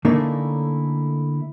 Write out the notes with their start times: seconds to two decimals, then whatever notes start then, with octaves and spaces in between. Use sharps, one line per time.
0.05 D3 A3 A#3 C#4 D#4 E4